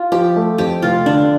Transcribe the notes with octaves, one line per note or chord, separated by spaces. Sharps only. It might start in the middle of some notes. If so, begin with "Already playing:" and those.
Already playing: F4
F3 G4
A3
F2 G4
F1 F4
D3 D4